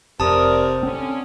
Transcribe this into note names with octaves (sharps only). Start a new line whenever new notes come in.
F1 C3 A3 A#4 D5 A5 D#6
D3 C4 C#4